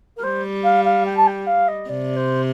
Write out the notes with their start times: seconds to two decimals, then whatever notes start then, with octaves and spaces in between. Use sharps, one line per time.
0.17 A#4
0.23 G3 C5
0.64 F5
0.85 F5
1.06 G5
1.17 A5
1.27 G5
1.47 F5
1.68 D#5
1.89 C3 D5
2.16 C5